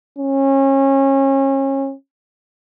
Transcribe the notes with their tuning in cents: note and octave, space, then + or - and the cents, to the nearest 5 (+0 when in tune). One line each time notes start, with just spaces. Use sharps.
C#4 -30